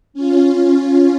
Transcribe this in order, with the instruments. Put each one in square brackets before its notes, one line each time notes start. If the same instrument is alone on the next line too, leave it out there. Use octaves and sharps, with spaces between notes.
[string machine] C#4 F4